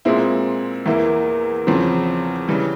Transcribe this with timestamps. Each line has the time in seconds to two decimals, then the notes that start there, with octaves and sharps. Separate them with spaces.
0.05 A#2 G#3 C4 E4
0.86 E2 E3 A#3 E4
1.67 E2 C#3 F3 C4
2.48 C#3 E3 G3